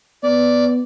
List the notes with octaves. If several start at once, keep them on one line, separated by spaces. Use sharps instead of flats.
B3 D5